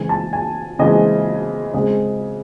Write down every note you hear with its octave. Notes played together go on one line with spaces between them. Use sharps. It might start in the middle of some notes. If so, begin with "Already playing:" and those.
Already playing: C#3 E3 G#3 C4 G#5
A5
G#5
C#3 E3 G#3 C4 D#5
C#3 G#3 C4 D#5